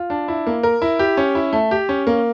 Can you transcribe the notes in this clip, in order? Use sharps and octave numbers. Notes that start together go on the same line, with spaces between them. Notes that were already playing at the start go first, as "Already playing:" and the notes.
Already playing: F4
D4
E4
A#3
A#4
E4
G4
C#4
E4
A3
G4
C#4
A#3